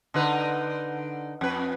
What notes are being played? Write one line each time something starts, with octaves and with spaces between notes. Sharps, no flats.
D3 D#4 B4
F2 B4